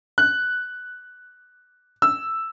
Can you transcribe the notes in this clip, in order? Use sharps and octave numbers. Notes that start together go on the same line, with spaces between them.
F#6
E6